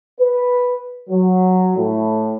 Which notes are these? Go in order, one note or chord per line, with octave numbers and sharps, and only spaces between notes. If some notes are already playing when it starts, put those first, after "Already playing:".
B4
F#3
A2